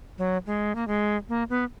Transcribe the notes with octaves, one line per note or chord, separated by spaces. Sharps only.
F#3
G#3
A#3
G#3
A#3
B3